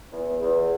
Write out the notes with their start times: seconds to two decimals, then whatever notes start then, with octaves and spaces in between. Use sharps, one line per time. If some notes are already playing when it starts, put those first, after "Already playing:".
0.12 E2
0.40 E2